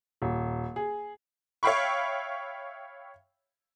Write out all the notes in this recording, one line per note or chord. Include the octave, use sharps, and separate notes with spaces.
D#1
G#4
C#5 E5 F5 G5 B5 C#6